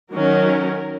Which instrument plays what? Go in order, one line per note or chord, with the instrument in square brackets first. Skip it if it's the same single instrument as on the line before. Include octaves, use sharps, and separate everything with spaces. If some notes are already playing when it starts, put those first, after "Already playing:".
[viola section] D#3 F#3 C#4 A#4